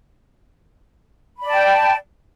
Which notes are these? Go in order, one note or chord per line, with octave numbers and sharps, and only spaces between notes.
D5 G5 A5 B5